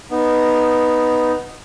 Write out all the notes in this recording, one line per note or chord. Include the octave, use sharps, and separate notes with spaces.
B3 D#4